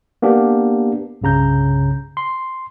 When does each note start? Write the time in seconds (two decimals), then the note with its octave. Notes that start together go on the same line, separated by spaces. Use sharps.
0.22 A#3 B3 D4 G4
1.21 C2 G2 C#3 A#5 G6
2.17 C6